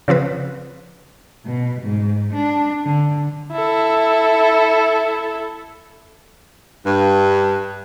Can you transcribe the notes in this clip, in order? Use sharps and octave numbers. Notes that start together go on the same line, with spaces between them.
C#3 F3 C4 B4
B2
G#2
D4
D3
E4 A4
G2